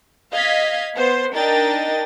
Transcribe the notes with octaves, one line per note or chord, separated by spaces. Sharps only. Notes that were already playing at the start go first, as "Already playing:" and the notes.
D#5 F5 G#6 B6
B3 C5
D4 D#4 A#4 D#5 G5 A6